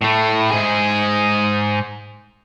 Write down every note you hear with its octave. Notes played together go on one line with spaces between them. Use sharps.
A2 A3
G#2 G#4